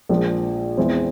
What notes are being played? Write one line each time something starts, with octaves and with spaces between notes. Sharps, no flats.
A#1 A#2 F3 G#3
E2 E3 G#3 C4